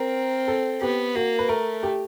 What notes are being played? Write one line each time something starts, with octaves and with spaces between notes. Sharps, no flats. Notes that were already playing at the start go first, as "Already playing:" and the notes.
Already playing: C4 A#4
A4
B3 G4
A#3 F#4
B4
A3 A#4
G4